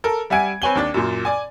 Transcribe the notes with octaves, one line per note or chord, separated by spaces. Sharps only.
A4 A#4
G3 E5 F#5 G#5 G#6 D7
C4 B4 C#5 G#5 F#7 G7
D#2 D4 A6
F#2 A#2
D5 G#5